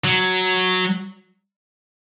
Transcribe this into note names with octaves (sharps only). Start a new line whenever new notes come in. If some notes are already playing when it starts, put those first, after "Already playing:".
F#3